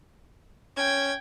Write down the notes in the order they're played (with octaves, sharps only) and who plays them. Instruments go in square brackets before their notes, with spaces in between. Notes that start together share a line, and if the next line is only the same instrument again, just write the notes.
[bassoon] C#4 [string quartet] G5 G#6